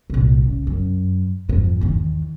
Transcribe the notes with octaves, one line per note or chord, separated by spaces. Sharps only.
C2 A#2
C#3
F#2
F2 G#2
E2 D#3